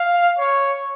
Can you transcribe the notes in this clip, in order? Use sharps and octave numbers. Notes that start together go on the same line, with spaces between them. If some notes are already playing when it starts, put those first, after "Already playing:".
Already playing: F5
C#5